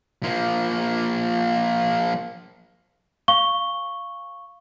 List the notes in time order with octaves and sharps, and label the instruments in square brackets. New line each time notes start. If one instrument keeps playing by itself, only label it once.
[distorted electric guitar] F3 A#3
[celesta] F5 C#6 G7